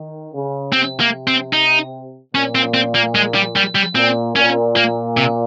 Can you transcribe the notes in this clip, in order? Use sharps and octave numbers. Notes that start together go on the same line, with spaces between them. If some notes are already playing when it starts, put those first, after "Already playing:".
Already playing: D#3
C#3
C3 C4
A#3
C4
D#4
A#2 C#4
C4
C4
A#3
G#3
G3
G3
G3
A#2 C4
A#2 C#4
A#3
C3